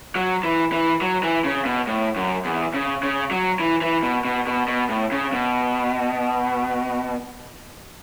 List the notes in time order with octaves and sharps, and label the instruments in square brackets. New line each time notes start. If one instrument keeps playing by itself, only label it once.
[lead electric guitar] F#3
E3
E3
F#3
E3
C#3
B2
A2
F#2
E2
C#3
C#3
F#3
E3
E3
B2
B2
B2
B2
A2
C#3
B2